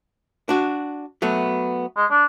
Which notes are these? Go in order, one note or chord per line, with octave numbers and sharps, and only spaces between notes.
D4 F#4
F#3 A3 B3
G#3
D4